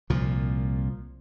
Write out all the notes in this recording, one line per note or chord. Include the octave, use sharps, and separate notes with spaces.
C2 A#2 F3